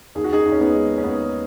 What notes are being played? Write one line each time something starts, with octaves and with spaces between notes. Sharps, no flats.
D#2 G#4
F#4
D#4 G#4
D#2
C#4
B3 D#4
G#3
C#4
D#2 B3